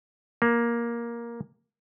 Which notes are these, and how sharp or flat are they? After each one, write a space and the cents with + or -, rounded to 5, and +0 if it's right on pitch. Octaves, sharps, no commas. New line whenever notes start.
A#3 +10